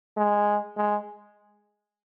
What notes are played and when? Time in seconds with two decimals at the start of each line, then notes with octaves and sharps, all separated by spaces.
0.17 G#3
0.77 G#3